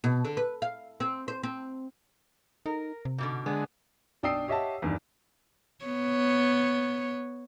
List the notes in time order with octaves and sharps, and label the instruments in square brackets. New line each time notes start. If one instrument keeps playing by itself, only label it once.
[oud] B2
D3
B4
F5
C4
C5
C4
[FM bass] D#4 [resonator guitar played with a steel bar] A#4
[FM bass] C3
[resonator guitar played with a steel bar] G#2 B2 D3
[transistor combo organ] D3 G#3 [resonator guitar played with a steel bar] B3
[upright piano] B1 D4 G5 D#6 E6 C7
G4 C#5 D#5 E5 F#5 A5
E2 G2 D#3
[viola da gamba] B3 C#5